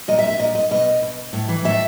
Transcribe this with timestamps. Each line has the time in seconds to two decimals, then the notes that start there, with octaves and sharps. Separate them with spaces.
0.08 A#2 D#5
0.19 E5
0.29 E5
0.39 A#2 D#5
0.55 D#5
0.71 B2 D#5
1.02 B2
1.33 A2
1.49 E3
1.64 A2 E5